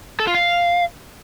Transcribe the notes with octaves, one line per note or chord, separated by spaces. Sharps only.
A4
F4
F5